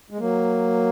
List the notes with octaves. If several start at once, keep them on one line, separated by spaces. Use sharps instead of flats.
G#3
F#3 A#3